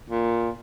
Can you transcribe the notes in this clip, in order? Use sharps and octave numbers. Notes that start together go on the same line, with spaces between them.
A#2